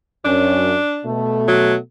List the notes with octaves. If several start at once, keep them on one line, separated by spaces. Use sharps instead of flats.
F#2 C#4 D4
B2 A3
F#3